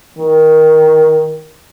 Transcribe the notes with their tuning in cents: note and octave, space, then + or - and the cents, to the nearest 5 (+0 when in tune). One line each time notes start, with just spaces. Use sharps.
D#3 +15